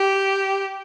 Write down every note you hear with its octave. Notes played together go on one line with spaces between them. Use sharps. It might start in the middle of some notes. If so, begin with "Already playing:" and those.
Already playing: G4